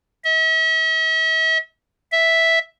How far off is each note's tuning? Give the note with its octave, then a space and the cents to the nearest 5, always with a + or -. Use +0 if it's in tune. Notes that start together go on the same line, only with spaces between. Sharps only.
E5 -45
E5 -5